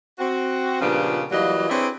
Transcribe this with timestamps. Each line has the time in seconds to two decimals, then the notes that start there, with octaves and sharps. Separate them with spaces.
0.19 C4 F#4
0.81 A#2 C#3 F3 B3 D4 G4
1.31 E3 F#3 G3 A#3 F4 D#5
1.70 C4 D4 E4 G#4 B4 C#5